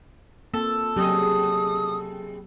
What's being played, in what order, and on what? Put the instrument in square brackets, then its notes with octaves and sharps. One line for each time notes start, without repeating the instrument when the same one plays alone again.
[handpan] A#3 C4 [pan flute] F4 [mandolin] A4
[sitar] C3 G#4 D#5 [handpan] F#3 C4 G4 [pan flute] D#6